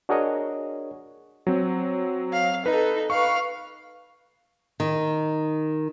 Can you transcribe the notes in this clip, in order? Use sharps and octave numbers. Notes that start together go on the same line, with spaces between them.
D4 F#4 G#4 A#4 C#5 D#5
F#3 C4
F5
D#4 A4 B4
B4 F5 C#6
D#3